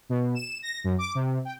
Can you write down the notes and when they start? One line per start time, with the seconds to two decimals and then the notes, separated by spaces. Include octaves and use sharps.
0.09 B2
0.35 E7
0.62 A#6
0.84 F#2
0.99 D6
1.15 C3
1.45 G5